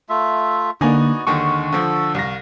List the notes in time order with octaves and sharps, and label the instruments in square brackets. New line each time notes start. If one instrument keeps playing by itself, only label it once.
[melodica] A3 F4 E5
[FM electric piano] D3 A#3 [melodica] B3 F#4 [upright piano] D#4 D5 G#5
[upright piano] D#2 D3 D#3 [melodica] G#3 [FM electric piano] C#6
[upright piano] D3 F3 [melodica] A4 E6
[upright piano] C2 A#6 [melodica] F5